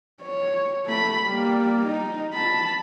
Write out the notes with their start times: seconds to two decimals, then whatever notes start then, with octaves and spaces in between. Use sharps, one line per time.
0.22 C#5
0.86 A3 B5
1.26 G3 A#3
1.86 D#4
2.33 A5 B5